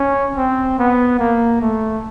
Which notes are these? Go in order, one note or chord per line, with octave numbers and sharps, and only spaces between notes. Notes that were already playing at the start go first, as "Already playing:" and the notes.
Already playing: C#4
C4
B3
A#3
A3